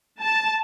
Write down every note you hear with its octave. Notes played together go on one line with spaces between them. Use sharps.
A5